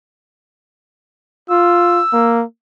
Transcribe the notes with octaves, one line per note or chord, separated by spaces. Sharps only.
F4 E6
A#3